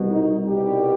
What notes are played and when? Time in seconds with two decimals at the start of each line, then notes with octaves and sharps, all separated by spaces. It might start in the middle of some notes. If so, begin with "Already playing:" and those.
Already playing: C2 B2 G3
0.10 D#4
0.49 C2 B2 G3 G4